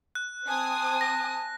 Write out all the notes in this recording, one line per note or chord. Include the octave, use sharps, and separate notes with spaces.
F#6
C4 G#5 A5 D#6
A#6